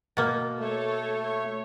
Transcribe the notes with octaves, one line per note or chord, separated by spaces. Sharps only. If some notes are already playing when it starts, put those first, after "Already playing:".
B2 A#3
A3 A4 C#5
C#5